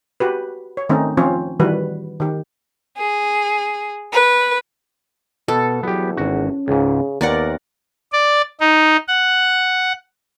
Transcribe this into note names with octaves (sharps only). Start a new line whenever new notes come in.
F#4 G4 B4
C#5
D#3 A3 C4 C#4 D#4
F3 C4 C#4 F4 C#5
D#3 E3 G3 F#4 B4
D#3 G4
G#4
B4
B2 B3 A4
E2 F#3 B3 G4
G#1 C#4 F#4
C#2 G#2 C#3
D#2 B3 A#4 D5 F#5
D5
D#4
F#5